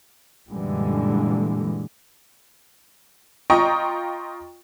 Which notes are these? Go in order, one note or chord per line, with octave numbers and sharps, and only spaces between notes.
F#2 A#2 D3 E3 G3 G#3
F4 D#5 G5 A#5 C#6 D#6